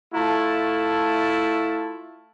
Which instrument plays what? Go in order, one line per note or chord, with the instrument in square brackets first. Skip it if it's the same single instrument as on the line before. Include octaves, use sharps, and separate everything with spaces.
[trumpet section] A3 E4 F4 A5